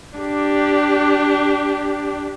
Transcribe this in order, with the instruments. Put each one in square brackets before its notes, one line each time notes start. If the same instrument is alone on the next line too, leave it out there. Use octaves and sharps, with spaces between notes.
[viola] D4 G4